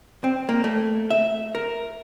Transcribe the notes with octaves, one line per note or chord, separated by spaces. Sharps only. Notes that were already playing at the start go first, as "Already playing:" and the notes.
C4
A#3
A3
E5
A#4